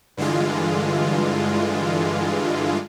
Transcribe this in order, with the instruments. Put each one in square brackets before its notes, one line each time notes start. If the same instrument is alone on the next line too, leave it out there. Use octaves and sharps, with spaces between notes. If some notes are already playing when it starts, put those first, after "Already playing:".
[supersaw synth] G2 D3 E3 G#3 F4